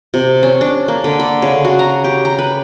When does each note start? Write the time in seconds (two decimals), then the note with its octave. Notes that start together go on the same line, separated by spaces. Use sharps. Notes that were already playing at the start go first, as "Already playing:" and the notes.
0.14 C3
0.43 C#4
0.61 D4
0.88 A#3
1.04 D3
1.19 B5
1.42 C#3
1.65 F#4
1.79 A#5
2.04 G4
2.25 A#5
2.39 B4